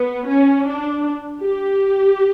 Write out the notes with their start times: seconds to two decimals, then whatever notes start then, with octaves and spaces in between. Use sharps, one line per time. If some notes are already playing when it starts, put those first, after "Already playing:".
Already playing: B3
0.28 C#4
0.66 D4
1.43 G4